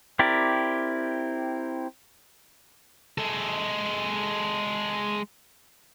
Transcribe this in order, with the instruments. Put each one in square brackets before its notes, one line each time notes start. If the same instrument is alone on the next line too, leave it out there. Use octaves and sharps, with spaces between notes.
[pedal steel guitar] C4 E4 G4 A#4 D5
[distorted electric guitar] G#3 A4